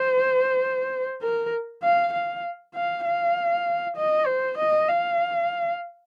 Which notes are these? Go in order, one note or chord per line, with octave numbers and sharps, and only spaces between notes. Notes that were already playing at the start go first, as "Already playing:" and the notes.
Already playing: C5
A#4
F5
F5
F5
F5
D#5
C5
D#5
F5